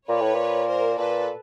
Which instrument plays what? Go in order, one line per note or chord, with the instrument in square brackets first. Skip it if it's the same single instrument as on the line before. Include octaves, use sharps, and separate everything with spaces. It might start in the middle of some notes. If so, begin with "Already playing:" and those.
[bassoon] A#2 [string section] B4 C#5
[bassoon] A2
A#2
[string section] A#4 C5
[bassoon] A#2 [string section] A4 B4